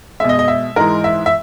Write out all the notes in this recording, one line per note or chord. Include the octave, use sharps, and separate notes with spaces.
B2 G#3 D#5 E5
D#5
E5
G#2 E3 G#3 A#4
E5
E5